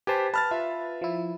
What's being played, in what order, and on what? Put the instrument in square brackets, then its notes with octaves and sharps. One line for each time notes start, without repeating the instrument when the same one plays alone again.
[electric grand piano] G4 B4 C5 [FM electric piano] G#5 A5
[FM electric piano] B4 [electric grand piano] A5 F6 A6
[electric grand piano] F4 E5
[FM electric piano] F3 E4